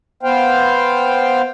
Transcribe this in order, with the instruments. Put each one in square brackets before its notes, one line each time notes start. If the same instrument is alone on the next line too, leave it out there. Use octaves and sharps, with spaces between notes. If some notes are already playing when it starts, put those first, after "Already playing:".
[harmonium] B3 C5 F5 G5